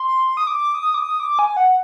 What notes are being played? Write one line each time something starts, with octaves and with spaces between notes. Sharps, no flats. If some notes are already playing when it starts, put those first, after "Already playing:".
Already playing: C6
D#6
D6
D#6
D6
D#6
D6
G#5
F#5